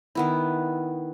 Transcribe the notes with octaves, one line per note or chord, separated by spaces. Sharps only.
D#3 B3 E4